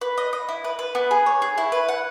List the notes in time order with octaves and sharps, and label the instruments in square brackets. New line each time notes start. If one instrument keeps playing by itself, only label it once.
[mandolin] B4
D#5
D#5
E4
B4
B4
B3
G#4
C#5
G#4
E4
B4
F#5